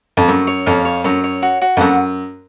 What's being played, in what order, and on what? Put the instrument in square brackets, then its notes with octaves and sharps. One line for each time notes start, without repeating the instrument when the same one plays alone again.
[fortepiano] F2
[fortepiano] F#2 [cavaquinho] C#6
[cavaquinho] C#5
[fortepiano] F2 [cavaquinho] F5
[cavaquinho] C#5
[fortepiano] F#2 [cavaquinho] C#5
[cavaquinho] C#5
F#4
F#4
[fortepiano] F2
[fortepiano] F#2 [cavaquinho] F#5